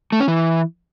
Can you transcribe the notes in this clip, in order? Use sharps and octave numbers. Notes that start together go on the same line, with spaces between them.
A3
C#4
E3